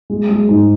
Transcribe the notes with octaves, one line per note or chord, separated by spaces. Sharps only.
G#3
G#3
G#2